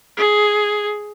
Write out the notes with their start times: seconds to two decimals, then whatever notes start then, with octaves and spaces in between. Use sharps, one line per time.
0.17 G#4